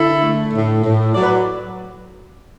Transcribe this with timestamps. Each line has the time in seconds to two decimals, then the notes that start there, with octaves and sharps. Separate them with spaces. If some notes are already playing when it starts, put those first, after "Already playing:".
Already playing: D3 E4 A4
0.23 A3
0.54 A2
0.84 A2
1.14 F#3 D5
1.22 B4